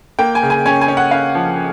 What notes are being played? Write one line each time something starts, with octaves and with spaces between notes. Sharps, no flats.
A#3 G5
G#5
C#3
G#5
C#4 G#5
G#5
C#4
F#5
C#4 F5
F3